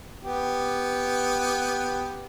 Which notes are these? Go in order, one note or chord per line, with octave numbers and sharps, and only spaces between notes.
B3 G4